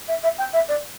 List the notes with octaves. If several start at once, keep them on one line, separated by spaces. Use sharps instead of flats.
E5
E5
G5
E5
D5